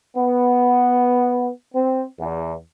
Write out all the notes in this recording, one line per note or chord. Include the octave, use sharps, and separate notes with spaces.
B3
C4
E2